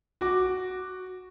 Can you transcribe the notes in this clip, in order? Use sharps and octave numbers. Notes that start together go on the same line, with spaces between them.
F#4 D6